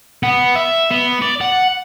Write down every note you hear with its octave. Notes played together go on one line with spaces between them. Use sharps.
B3
E5
B3
D5
F#5